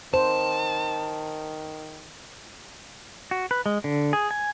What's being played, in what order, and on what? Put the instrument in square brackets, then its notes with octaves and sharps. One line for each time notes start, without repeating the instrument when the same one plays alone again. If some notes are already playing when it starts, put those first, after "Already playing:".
[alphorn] D#3 [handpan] C5 [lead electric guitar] A5
[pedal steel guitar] F#4
B4
G#3
D3
G#4
G#5